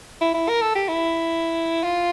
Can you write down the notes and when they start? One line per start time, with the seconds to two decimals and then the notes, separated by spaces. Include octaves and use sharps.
0.21 E4
0.34 E4
0.49 A#4
0.62 A4
0.75 G4
0.88 E4
1.83 F4